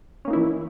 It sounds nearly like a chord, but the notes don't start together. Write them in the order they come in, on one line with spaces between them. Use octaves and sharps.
C#4 A#3 D#4 E4 E3